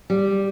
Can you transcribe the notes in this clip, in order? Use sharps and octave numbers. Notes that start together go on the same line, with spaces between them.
G3